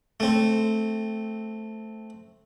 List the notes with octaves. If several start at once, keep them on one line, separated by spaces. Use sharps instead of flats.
A3 C4